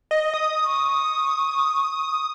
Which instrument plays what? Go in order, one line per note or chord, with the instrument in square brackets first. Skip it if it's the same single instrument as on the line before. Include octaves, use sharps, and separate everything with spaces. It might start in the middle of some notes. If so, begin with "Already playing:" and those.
[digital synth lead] D#5
D#6
[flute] C#6